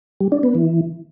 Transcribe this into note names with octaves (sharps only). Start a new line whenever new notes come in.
G3
D4
B3
E3